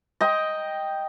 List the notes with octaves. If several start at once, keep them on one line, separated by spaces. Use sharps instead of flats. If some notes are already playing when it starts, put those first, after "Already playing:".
D#5 G5 A#5